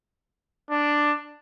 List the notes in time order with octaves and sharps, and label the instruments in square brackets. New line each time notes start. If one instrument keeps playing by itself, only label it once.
[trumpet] D4